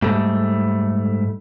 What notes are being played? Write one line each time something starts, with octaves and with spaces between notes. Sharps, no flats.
G#2 G3 A3